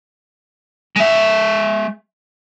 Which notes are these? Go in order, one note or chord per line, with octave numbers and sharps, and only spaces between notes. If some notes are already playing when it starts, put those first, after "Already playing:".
G#3 E5